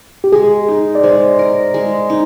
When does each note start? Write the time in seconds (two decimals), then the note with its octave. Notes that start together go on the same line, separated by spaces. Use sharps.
0.24 G4
0.32 G#3 G#4
0.68 D#4
0.95 D5
1.03 G#3 C5
1.39 A#4
1.74 G#3
2.10 D#4